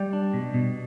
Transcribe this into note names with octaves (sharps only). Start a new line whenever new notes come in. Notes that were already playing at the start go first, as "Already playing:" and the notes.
Already playing: G3 D5 G5
D4
B2
B2